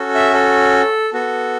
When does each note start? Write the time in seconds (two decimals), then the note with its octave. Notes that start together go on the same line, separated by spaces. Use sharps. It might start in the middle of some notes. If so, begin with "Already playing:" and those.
Already playing: C#4 F#4 A4
0.15 E5
0.34 A4
1.13 B3 F#4 A4